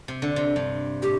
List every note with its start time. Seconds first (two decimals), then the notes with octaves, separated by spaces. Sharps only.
0.08 C3
0.22 D3
0.36 C3
0.56 G2
1.02 A2 G4